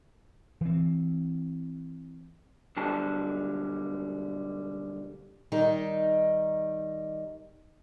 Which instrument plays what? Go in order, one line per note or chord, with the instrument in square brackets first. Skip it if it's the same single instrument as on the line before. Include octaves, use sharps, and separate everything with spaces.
[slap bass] E3 C4
[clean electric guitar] B1 D3 G3 A5
[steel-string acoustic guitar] D#3 G3 D#4